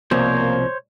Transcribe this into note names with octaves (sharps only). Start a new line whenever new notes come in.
C2 B2 F3 A#3 C4 C5 C#5